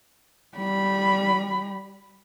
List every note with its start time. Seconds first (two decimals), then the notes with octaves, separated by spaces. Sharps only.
0.57 G3 B5